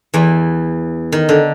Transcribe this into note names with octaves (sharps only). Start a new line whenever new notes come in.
E2 E3
D#3
D3